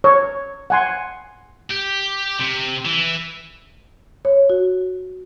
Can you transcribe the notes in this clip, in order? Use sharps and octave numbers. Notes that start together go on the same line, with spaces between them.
C#5
F#5 G#5 C6
G4
C3
E3
C#5
F#4